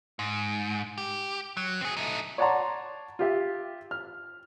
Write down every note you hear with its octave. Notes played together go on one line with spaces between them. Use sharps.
G#2
G4
F#3
C4 G#4
A3 D#4
C#5 D5 F#5 A5 A#5 C6
F4 G4 E5
F6